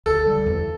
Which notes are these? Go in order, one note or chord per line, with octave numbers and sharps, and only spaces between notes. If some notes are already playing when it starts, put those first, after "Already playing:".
D2 A4
D3 G3
E2